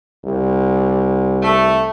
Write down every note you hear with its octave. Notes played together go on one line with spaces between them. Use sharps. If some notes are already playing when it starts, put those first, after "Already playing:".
C2
A3